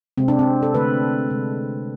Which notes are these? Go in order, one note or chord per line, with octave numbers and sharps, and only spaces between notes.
C3 G#3 C4
D4
C4
A4
D3 A3 B4
C3 G#3